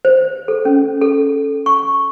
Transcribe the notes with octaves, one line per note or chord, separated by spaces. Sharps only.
C5
A4
C#4
A4
C#6